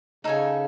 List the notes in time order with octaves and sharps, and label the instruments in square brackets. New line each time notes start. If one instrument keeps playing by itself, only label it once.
[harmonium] C#3 [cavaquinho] D#4 A4 C#5 G#5